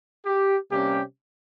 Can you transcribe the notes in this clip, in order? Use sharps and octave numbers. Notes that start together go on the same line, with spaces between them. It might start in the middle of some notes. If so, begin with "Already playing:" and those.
G4
C3 G3 A#3 C#4 G4